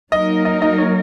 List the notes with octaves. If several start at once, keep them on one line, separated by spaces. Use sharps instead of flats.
F#3 A#3 D#4 A#4 D#5
D#5
D#5
C#5